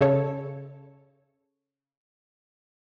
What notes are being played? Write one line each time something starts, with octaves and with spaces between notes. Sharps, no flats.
C#3 A4 C#5